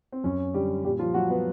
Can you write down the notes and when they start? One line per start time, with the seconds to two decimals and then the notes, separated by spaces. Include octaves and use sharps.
0.12 C4
0.24 F#2 C#4
0.54 D3 G3 G4
0.84 A#2 G3 G4
0.99 F3 F4
1.14 F#3 G3 F#4
1.30 B3 B4